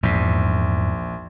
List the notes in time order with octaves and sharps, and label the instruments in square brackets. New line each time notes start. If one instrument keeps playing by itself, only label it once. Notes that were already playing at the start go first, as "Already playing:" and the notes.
[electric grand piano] A#1 [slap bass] E2 G#2